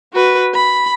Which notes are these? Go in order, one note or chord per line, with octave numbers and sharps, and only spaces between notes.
F#4 B4
B5